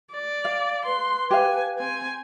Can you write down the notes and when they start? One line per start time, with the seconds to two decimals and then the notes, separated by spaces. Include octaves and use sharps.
0.13 D5
0.45 F5
0.86 B4 C6
1.31 G4 F5 G#5
1.78 C4 G#5